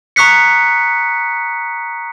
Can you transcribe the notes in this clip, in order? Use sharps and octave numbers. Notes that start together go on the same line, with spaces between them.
A#5 C#6 D#6 F#6 B6 C#7